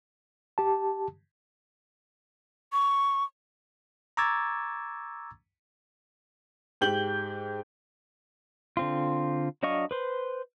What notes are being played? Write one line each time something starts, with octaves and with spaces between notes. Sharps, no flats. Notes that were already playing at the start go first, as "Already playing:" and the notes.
G4 A5
C#6
A#5 C#6 D6 E6 G#6 A6
G#2 G4 G6 F#7
D3 C4 F4
F#3 D4 D#5 F5 C#6
B4 C5